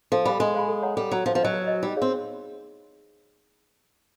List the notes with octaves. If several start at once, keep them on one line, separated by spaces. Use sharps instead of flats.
F3 A4
G3 C5 F5 G#5 B5
G#3 A4
C5 F5 G#5 B5
A4
C#5 F#5 A#5
G3 A4
F#3 C#5 F#5 A#5
F3 B4
F3
F#3 D#5 G#5
B4
D#5 G#5
G3 D#4
C4 G#4 C#5 F5